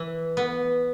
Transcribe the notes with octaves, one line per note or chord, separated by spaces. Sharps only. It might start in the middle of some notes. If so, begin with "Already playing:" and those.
Already playing: E3
B3